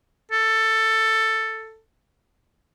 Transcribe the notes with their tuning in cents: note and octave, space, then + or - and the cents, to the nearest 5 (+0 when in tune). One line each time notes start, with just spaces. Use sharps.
A4 +10